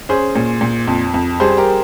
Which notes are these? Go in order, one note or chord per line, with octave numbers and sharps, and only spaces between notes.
C#4 G#4 C5
A#2
A#2
F2
F2
G3 G#4 C5
G4 A#4